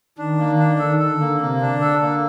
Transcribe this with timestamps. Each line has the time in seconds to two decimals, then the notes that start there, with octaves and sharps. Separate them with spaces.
0.18 D#3 D4
0.39 A#3
0.49 D#3
0.59 D4
0.79 D#3 A4
0.99 A4
1.10 D3
1.20 A#3
1.41 C3 A#3
1.61 D4
1.71 D3
1.81 A4
2.02 A#3